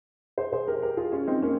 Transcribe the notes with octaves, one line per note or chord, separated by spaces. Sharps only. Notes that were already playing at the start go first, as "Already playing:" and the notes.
G#4 C5
G#4 C5
G4 A#4
G4 A#4
F4 G#4
C#4 F4
C4 D#4
A#3 C#4